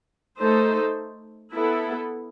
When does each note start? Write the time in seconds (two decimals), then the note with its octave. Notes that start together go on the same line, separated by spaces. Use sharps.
0.39 A3 D#4 A4 C5
1.54 B3 E4 A4